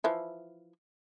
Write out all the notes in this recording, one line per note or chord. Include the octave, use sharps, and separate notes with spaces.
E3 F3 E4